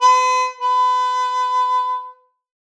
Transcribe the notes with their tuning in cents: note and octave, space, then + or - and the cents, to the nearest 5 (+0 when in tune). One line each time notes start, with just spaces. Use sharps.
B4 +45
B4 +30